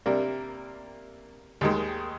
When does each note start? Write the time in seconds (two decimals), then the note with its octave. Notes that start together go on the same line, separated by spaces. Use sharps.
0.06 C3 G3 A#3 D4
1.61 D#2 D#3 G#3